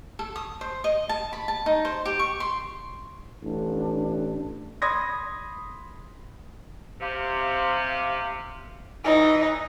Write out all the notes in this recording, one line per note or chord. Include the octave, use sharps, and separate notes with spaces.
A4
D#6
C5
D#5
A5
B5
A5
D#4
C5
G4
C#6
C6
A1 D4
B5 C6 D#6 G#6 A#6
C3 F5
E3 D#4